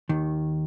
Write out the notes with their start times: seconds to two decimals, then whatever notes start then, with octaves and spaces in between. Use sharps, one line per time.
0.09 D#2 D#3